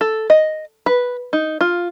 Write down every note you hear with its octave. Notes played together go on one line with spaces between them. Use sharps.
A4
D#5
B4
D#4
F4